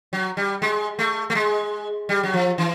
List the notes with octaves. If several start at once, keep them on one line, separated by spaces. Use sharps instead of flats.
F#3
G3
G#3
A3
A3
G#3
G3
F#3
F3
E3